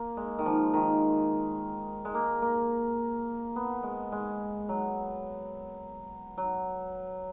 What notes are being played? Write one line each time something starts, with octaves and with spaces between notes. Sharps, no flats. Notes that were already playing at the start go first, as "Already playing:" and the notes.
Already playing: A#3
G#3
D#3
F3
D#3
G#3
A#3
A#3
B3
G#3
G#3
F#3
F#3